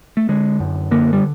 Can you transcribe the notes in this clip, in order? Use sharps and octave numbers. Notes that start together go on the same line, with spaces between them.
A3
D3 G#3
F#2
D3 A#3
G3